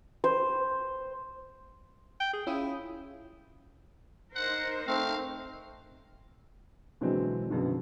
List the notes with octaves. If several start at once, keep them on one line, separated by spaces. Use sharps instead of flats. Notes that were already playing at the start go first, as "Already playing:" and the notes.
C5
G5
G#4
C#4 E4 F4 D#6
D#4 A#4 C5 F#5
A3 C4 F5
B2 D3 E3 F#3 G#3 C4
A#1 F#2 B2 D3 D#3